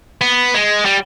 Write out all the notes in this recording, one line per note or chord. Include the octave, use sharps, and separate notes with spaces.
B3
G#3
G3